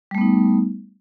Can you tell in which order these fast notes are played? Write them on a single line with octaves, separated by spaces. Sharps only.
G3 A3 B3 D#4